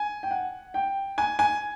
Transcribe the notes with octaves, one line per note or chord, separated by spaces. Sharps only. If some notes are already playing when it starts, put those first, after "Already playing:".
Already playing: G#5
G5
F#5
G5
G#5
G#5